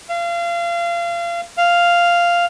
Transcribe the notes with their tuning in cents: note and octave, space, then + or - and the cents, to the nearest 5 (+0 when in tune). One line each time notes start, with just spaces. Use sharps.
F5 -30
F5 -5